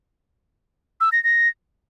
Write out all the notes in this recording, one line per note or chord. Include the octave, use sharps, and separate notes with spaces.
E6
A#6
A#6